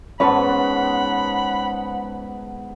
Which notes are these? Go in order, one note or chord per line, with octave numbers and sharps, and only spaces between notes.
G#2 B3 C#4 B4 F#5 A5 B5